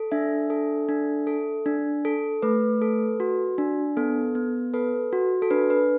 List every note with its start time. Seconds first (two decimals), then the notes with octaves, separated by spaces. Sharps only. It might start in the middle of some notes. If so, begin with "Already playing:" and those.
Already playing: A4
0.12 D4 E5
0.50 A4
0.89 D4
1.27 A4
1.66 D4
2.05 A4
2.42 A3 B4
2.82 A4
3.20 F#4
3.58 D4
3.97 B3 A4
4.35 B3
4.74 A4 B4
5.12 F#4
5.42 A4
5.51 D4 B4
5.70 B4